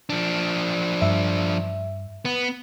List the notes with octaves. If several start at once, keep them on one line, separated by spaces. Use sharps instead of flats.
F3 D4
G2 E5
B3